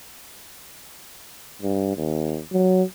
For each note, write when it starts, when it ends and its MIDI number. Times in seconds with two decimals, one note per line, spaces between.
1.62 1.96 43
1.97 2.40 39
2.52 2.83 54